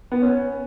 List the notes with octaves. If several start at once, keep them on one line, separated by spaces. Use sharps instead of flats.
B3
C#4